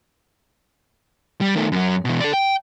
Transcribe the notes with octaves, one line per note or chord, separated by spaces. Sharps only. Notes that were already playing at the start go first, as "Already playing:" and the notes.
G3
D#3 A3
F#2 F#3
B2 E3
A4 D5
G5